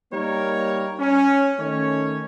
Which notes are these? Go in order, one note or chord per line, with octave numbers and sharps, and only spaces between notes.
G3 A#3 D#4 A#4 C#5
C#4
D#3 A3 C#4 C#5